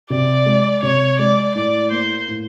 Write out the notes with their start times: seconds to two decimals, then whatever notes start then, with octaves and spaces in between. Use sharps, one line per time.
0.10 C3 D5
0.46 G#3
0.83 C3 C#5
1.19 G#3 D5
1.55 A2 D5
1.91 A#3 C5
2.28 A2